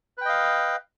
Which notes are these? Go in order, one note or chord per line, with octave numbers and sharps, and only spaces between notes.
B4 D#5 F5 G5